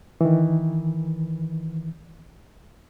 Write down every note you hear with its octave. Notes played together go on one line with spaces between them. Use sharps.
D#3 E3